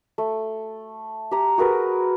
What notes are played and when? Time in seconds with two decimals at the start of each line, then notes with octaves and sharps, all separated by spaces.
0.18 A3
1.31 G4 A#5
1.58 F#4 G#4 A#4 B4